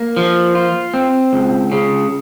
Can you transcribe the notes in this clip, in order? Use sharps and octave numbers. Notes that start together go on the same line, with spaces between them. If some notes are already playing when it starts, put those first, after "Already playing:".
Already playing: A#3
F3
F4
C4
C#2
C#3